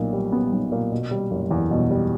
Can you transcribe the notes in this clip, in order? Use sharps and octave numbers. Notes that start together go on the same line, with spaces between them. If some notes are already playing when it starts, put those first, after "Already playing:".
Already playing: B1 A#2 B3
G3
B3
B1
A#2
B2
G3
F#1
E2
B2
G3